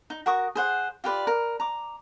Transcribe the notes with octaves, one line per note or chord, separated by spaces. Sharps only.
D#4
F#4 A#4 C#6 D#6
G#4 C5 F#5
F4 G4 B4 D5
A#4
A#5 D6